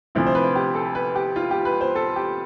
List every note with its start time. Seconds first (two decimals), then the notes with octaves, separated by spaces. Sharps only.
0.15 D2 C3 F3 E4
0.27 C5
0.35 B4
0.55 G4
0.75 A4
0.95 B4
1.15 G4
1.36 F4
1.51 G4
1.65 B4
1.81 C5
1.95 A4
2.16 G4